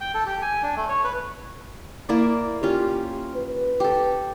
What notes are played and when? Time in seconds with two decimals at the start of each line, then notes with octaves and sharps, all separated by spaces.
0.01 G5
0.15 A4
0.26 G4
0.42 G#5
0.63 D4
0.76 A3
0.89 C#5
1.04 B4
2.09 A#3 E4 D5
2.63 C#4 F4 G4
3.35 B4
3.80 G4 A4